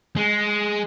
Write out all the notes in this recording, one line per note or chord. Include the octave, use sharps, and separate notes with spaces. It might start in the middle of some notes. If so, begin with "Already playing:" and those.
G#3